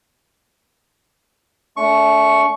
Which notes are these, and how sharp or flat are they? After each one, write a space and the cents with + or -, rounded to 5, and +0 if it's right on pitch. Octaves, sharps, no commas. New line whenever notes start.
A3 +0 D4 -35 C#6 +0